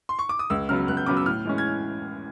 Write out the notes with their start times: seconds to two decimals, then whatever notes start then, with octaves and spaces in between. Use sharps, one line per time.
0.09 C6
0.19 C#6
0.29 D6
0.39 D#6
0.50 C#2 E6
0.69 C#3 F#3 B3 F6
0.88 C#2 F#6
0.97 G6
1.06 C#3 F#3 B3 D6
1.17 E6
1.26 A2 F6
1.45 E3 G#3 C#4
1.58 G#6